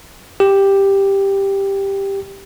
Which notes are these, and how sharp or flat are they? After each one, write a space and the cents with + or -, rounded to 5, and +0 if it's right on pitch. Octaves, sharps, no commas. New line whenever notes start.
G4 +5